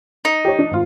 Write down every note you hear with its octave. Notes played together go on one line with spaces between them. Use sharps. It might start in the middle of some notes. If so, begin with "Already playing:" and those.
D#4
G4 C#5
D4
G#1 F4